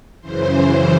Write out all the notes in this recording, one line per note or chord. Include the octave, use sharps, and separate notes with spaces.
F#2 C#3 E3 C5
C5